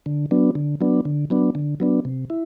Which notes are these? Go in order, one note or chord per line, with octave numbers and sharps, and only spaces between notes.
D3
F#3 B3 D4
D3
F#3 B3 D4
D3
F#3 B3 D4
D3
F#3 B3 D4
C3
E4